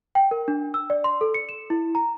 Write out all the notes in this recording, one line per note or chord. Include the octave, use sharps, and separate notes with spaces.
G5
A#4
D4
E6
D5
C6
A4
C#7
E7
E4
A#5